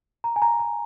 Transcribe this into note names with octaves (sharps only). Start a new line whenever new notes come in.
A#5
G#5
A#5
A#5